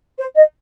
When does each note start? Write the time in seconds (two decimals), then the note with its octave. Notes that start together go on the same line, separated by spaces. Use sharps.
0.19 C5
0.37 D#5